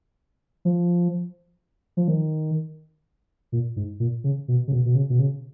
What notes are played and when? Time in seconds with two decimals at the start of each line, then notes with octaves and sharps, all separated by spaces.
0.65 F3
1.97 F3
2.08 D#3
3.52 A#2
3.76 G#2
4.00 A#2
4.24 C#3
4.48 B2
4.68 C#3
4.72 B2
4.86 B2
4.95 C#3
5.10 B2
5.19 C#3